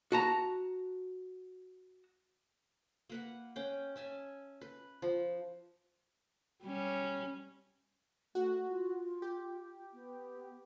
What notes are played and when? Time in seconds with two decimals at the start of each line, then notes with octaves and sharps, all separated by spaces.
0.12 F#4 A5 A#5
3.10 A#3 B4 F#5
3.56 C#4 G5
3.96 C#4 E5 G#5 A5
4.61 B4
5.02 F3
6.63 G3 C#4
8.35 A3 F#4
8.69 F4
9.22 G4
9.94 B3